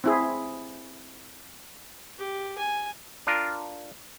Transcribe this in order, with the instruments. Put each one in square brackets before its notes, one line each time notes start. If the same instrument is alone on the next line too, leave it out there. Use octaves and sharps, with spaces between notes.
[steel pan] C4 E4 G#4
[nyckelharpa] G4
G#5
[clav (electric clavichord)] D4 F4 A#4